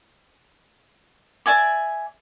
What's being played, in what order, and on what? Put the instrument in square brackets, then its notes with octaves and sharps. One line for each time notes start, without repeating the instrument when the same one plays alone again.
[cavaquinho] D5 E5 G#5 D6